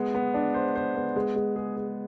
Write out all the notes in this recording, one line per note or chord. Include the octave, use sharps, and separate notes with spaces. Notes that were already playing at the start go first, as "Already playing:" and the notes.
Already playing: G#3 B3
B3
D4
C5
C5
B3
G#3
G#3
G#4
G#4